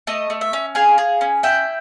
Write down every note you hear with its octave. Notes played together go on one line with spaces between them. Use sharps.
A3 D#5
A3
E5
C#4
G#4 F5
G#4
C#4
E4 G5